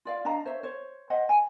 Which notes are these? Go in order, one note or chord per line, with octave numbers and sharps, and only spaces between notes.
F4 D5 F5
D4 D#5 F5 A#5
C5 C#5 E5
C5 C#5
C5 D#5 F#5
G#5 B5